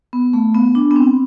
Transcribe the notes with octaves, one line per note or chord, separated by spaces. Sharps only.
B3
A3
B3
D4
B3
C4